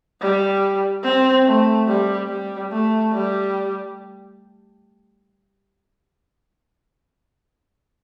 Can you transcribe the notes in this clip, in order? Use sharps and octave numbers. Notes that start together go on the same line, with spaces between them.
G3
C4
A3
G3
G3
A3
G3